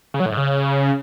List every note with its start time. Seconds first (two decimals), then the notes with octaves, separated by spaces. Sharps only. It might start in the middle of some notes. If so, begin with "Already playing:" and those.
0.14 C#3
0.20 F#3
0.26 A2
0.32 G#2
0.37 C#3